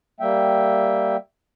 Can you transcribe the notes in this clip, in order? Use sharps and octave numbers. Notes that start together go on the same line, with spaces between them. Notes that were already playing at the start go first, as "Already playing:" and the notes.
G3 A#3 E5 G5